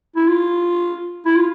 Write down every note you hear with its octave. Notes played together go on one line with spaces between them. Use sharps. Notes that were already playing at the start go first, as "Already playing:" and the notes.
E4
F4
E4
F4